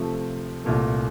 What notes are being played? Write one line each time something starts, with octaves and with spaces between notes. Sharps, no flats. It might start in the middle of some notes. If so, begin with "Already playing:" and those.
Already playing: C3 F3 A3
C2 A#2 A3